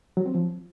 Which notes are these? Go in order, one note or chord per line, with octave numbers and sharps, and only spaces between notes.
F#3
C4
F3